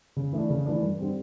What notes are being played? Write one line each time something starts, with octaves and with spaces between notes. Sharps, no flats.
C#3
E3 A3 D4
C#3
E3 A3 D4
G2
D3 G3 C4